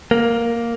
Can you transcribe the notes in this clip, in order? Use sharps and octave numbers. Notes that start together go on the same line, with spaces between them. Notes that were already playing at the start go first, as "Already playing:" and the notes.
A#3